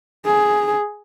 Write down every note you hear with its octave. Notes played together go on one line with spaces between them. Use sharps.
G#4